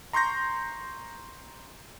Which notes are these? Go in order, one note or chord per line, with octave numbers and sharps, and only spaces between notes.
A#5 C6 C#6 G6 A#6